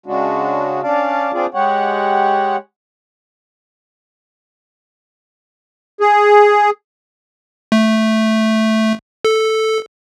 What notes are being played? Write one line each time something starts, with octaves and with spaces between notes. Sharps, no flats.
C#3 G#3 D4 F#4
C#4 D4 D5 F5 A5
C4 D4 F4 G#4 D5
G#3 G4 C#5 F#5
G#4
A3
A4